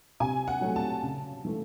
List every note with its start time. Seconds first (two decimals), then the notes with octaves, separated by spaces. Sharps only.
0.20 C3 G#5
0.48 F#5
0.61 F#3 A3
0.76 A5
1.03 C#3
1.45 E3 A3